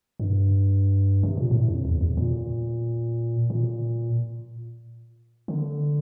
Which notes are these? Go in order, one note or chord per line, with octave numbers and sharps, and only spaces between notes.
G2
C3
A#2
A2
F2
E2
E2
A#2
A#2
D3